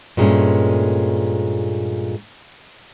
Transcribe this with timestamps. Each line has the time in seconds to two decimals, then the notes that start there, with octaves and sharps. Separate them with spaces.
0.17 G2 A#2 G#3 A3 C#4